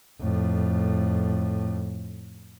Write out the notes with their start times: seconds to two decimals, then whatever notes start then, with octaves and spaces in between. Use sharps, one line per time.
0.21 F2 A2